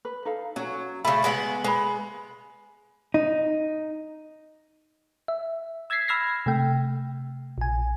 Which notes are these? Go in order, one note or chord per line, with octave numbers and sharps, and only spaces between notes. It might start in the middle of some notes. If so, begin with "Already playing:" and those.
B4
D#4 A4 F5
F#3 C#4 F#4
C#3 A3 B5
G#3 B3 F#5
G#3 B4 B5
D#4
E5
E6 G#6 A6 B6 C7
B5 E6 F6 G#6 A#6 C7
C3 A3 G5
A#1 G#5